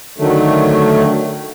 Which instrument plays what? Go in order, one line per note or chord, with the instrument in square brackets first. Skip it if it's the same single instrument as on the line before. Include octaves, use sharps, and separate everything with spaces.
[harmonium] D3 D#3 F#3 A3